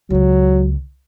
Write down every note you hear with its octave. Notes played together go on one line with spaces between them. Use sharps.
C#2 C#3 F#3